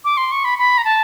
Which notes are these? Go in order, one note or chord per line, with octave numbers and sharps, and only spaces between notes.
D6
C6
C#6
B5
B5
A#5
A5